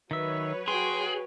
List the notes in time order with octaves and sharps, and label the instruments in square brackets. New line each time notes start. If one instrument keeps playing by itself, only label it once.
[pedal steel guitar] D#3 E5 [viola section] F#3 B4 C#5
[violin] F#4 G5 [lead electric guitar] G#4 [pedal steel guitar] C6